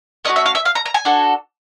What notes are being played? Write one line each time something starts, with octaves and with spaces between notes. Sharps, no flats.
A3 C#4 F#4 D#5
E5
F5
E5
F5
A#5
A#5
G#5
D4 F#4 A4